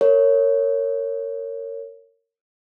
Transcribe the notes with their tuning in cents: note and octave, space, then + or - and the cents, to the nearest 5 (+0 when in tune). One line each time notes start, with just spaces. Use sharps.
A#4 -25 C#5 +0